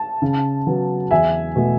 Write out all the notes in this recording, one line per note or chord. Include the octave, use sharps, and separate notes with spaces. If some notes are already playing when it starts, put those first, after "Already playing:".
Already playing: A5
C#3
F#3 B3
E2 E5 G#5
B2 A3